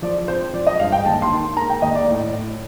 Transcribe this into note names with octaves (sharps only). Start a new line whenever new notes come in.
F3 D5
C4 C5
F3 D5
D#5
G2 F5
G5
D#2 A5
C6
D#3
A#3 A#5
G5
D#2 D#5
D5
A2
A2